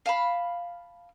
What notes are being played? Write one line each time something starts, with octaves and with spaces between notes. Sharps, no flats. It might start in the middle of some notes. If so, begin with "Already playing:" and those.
F5 A5 B5